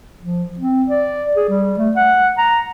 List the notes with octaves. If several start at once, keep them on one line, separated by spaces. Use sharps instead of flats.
F3
C4
D5
G#4
G3
A3
F#5
A#5